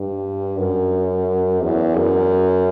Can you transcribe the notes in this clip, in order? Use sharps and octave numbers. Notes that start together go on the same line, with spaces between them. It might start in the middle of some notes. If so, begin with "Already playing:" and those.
Already playing: G2
F#2
E2
F#2